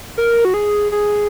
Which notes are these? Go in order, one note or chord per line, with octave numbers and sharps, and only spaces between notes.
A#4
F#4
G#4
G#4